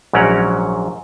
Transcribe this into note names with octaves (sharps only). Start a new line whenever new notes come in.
A#1 G#2 F#3 C#4 A#4 F#5